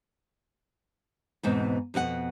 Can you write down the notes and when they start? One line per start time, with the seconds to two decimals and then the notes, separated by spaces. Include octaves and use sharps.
1.43 E2 G#2 B2 C4
1.94 F2 B2 A4 F#5